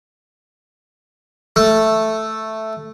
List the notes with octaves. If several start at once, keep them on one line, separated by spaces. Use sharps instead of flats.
A3